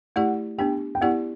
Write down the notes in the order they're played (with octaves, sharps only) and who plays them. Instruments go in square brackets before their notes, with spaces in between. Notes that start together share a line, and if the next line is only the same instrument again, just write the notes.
[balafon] A3 E4 G4 D5 [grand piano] F#5
[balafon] B3 D4 G4 [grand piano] G5
[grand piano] G5
[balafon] B3 E4 G4 D5 [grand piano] F#5